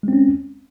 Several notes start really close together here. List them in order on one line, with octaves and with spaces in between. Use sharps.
G#3 C4 C#4